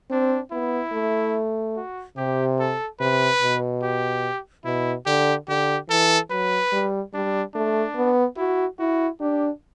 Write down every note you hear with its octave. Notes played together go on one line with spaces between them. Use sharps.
C4 D4
B3 E4
A3
F#4
C3 G4
A4
C3 B4
B2
G4
B2 E4
D3 G4
D3 G4
E3 A4
F#3 B4
G3
G3 D4
A3 D4
B3
E4 F#4
E4 F#4
D4 G4